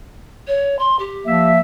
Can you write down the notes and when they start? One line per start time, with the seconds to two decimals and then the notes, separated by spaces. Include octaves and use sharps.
0.47 C#5
0.79 C6
0.99 G4
1.26 F3 A#3 E5